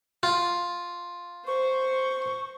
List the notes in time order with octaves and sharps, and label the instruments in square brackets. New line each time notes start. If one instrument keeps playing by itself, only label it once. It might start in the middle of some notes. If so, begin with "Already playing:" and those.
[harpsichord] F4
[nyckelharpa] C5 [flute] C#6